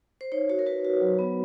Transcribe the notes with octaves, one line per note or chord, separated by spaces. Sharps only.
C5
D#4 C#5
F#4 C#5
A#4
F#4 B4
F#4
F#3
B3